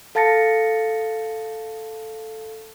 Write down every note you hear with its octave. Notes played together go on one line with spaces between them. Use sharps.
A4 F5 A5 A6 A#6 C#7